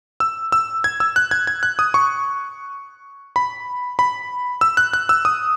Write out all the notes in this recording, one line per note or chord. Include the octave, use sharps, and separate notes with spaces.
E6
E6
G#6
E6
F#6
G#6
G#6
F#6
D#6
C#6
B5
B5
E6
F#6
F#6
E6
D#6